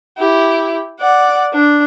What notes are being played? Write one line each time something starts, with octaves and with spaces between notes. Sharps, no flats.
E4 G4
D5 F#5
D4